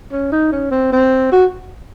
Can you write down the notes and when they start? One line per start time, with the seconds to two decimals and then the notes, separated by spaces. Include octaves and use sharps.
0.12 C#4
0.32 D#4
0.52 C#4
0.71 C4
0.92 C4
1.32 F#4